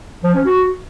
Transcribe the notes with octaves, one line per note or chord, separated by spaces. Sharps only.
F3
C#4
F#4